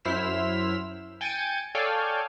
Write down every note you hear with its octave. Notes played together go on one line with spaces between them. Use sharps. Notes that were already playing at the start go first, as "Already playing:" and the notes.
F#2 E4 C5 F6 B6 E7
G5 G#5 A6 C#7 D#7
A4 C#5 D5 F5 G5 G#5